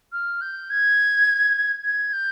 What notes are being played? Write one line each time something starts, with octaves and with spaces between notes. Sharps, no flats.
F6
G6
G#6
G#6
G6